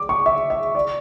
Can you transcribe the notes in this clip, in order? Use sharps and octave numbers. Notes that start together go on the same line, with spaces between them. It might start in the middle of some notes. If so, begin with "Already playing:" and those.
Already playing: D6
C#6
E5
E5
D5